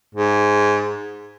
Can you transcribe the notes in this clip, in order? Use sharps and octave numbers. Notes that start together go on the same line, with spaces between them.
G#2